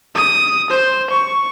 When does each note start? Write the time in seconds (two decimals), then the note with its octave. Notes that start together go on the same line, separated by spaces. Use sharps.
0.15 D#6
0.71 C5
1.11 C#6